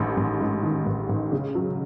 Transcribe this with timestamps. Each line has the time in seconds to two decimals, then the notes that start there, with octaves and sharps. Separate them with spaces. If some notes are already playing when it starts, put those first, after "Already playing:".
Already playing: A1 G#2 D#3
0.17 A1
0.41 G#2
0.63 D#3
0.86 A1
1.09 A1
1.32 C#3
1.55 F#3